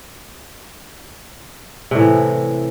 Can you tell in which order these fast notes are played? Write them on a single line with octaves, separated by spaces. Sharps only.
C3 A2 E3